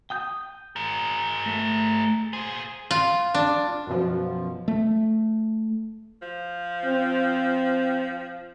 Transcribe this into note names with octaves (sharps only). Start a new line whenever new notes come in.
G5 D#6 G6
G#4 A#4
A3
A#2 G#4 C5
F4
D4
F#2 B2 F3
A3
F3
C4